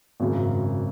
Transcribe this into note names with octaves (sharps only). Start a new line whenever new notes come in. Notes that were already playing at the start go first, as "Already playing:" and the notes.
G#1 F#2 C#3